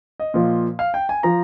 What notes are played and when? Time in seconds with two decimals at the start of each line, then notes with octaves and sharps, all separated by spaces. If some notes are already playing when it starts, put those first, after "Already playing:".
0.20 D#5
0.34 A#2 F3
0.79 F5
0.94 G5
1.09 G#5
1.23 F3 A#5